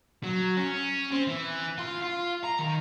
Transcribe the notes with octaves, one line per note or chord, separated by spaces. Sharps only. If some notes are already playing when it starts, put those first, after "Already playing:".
F#3
C#4
C4
E3
F4
F4
A#5
D#3